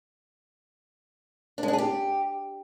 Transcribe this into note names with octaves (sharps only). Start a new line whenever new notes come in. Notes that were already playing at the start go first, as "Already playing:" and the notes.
D4
G#3
D4
G#4
G4